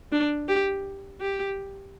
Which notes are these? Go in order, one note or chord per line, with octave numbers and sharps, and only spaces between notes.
D4
G4
G4